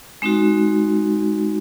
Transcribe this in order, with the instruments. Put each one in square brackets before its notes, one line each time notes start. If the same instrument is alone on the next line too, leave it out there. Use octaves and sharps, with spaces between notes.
[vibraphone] G#3 C4 D#4 F#4